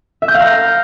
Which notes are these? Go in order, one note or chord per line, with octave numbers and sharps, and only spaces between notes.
E5
G6
F5
A#5
F6